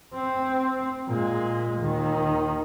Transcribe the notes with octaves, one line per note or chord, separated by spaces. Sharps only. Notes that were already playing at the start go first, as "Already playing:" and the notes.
C4
A#2 G#3
D#2 D#3